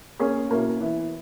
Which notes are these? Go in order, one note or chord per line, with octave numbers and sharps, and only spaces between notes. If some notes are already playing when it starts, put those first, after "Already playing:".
A#3 C#4 G#4 C#5
B2 A#3 C#4 E4
E3 B3 E4